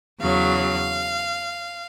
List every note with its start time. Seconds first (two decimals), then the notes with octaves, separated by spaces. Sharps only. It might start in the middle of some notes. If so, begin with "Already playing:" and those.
0.20 E2 C#3 F#3 F5